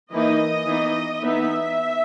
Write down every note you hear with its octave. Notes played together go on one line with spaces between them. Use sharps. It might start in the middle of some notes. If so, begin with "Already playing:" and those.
E3 A#3 D#4 D#5
E3 B3 D#4
E3 B3 D#4 E5